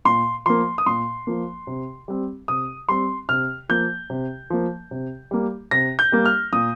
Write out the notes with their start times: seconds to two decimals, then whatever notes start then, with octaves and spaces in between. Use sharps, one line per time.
0.05 A#2 C6
0.46 F3 A#3 C6
0.78 D#6
0.86 A#2 C6
1.27 F3 A#3
1.67 C3
2.08 G3 C4
2.48 C3 D#6
2.89 G3 C4 C6
3.29 C3 F6
3.69 F3 A#3 G6
4.10 C3
4.50 F3 A#3
4.91 C3
5.31 G3 A#3
5.71 C3 A#6
5.99 G6
6.12 G3 A#3
6.25 F6
6.53 A#2 D#6